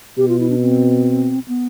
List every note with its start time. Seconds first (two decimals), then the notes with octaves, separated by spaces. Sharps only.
0.17 B2 G4
0.29 F4
0.40 E4
0.50 D4
0.61 C4
1.48 B3